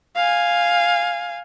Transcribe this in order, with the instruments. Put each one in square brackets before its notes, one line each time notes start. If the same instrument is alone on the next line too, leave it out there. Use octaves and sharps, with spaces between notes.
[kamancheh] F5 G#5